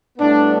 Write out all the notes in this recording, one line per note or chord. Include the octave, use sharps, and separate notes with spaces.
A2 G3 B3 D4